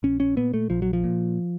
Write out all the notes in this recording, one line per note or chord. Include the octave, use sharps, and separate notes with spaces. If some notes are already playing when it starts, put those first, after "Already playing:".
A#1 C#4
C#4
A#2 B3
A3
A#1 F3
F#3
F3
A#2